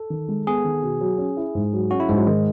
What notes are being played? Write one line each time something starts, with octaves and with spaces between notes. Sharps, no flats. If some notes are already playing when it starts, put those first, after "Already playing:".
Already playing: A4
D#3
G#3
B3 G#4
D#3
B2
F#3
C#4
E4
G#2
F#3
C#4 F#4
E4
G#2 G#3
F#3
D#3 G#3